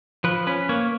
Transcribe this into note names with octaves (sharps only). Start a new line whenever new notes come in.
F3 B4
C#4 B4
A#3 C#5